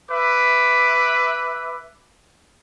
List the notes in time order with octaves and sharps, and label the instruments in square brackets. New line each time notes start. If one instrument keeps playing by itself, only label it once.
[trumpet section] B4 E5 D6